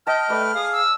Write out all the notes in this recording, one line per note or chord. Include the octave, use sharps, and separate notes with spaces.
D#5 G5 A5 F6
A3 B4 D5
G#4 F5 D#6
E6